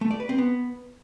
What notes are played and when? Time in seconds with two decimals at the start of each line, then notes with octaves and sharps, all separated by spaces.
0.01 A3
0.11 D5
0.20 B4
0.29 C4
0.38 B3